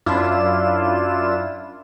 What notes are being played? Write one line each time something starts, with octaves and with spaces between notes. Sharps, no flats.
F#2 D4 E4 F4 E7